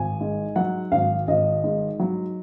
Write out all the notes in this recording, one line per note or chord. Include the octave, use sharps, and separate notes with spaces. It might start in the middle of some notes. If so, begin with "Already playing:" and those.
Already playing: G#1 G#5
G#2
F#3 F#5
G#1 F5
G#1 D#5
G#2
F#3